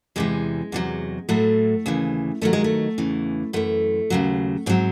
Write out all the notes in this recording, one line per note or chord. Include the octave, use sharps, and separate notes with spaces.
E2 C3 E3 G#3
E2 C3 F#3
A2 F#3 A3
D#2 C#3 E3
D#2 D#3 F#3 A3
G#3
A3
E2 C#3 E3
F#2 E3 A3
D#2 C#3 F#3
G#2 F#3 C4